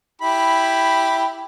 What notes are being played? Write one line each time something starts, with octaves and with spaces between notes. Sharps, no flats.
E4 G4 B5